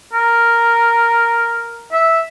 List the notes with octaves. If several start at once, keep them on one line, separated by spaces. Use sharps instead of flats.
A#4
E5